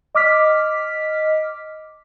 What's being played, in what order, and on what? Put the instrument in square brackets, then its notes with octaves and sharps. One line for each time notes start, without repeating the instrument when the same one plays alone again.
[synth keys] D#5 D6 F6 B6